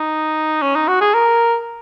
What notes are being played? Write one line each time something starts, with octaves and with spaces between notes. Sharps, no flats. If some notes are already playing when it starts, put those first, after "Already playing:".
Already playing: D#4
C#4
D#4
F#4
G#4
A#4